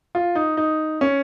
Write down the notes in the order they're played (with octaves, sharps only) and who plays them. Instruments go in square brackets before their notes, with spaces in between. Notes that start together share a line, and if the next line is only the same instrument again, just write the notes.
[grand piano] F4
D#4
D#4
C#4